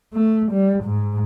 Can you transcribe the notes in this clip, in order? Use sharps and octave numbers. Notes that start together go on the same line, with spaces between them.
A3
G3
G#2